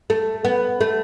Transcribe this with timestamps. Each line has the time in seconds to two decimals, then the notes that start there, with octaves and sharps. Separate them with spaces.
0.10 A3
0.45 B3
0.81 A3